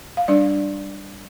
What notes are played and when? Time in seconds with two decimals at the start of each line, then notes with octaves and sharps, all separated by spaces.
0.17 F5
0.28 G3 D4 D5